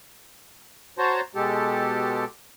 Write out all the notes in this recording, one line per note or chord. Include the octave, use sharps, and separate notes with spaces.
F#4 C5 C#5 A5 A#5 C6
B2 G#3 G4 A4